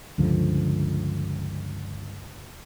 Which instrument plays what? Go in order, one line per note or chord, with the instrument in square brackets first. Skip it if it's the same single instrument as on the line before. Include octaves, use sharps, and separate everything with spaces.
[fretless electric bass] C#2 G2 D3 F3